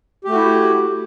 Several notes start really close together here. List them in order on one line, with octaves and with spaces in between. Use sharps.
G4 A3 F#4 E4